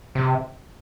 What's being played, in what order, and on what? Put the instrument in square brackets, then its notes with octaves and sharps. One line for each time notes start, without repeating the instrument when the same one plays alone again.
[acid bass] C3